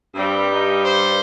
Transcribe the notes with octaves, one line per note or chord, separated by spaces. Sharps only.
G2 G3 C4
D#4
C5